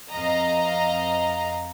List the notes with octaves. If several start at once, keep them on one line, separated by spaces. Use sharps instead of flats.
F2 D#5 F5 A#5